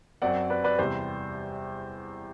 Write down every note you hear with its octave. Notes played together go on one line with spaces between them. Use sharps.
F#2 F#3 C4 D5 F#5
B4 D5
B4 D5
E2 C3 G3 C5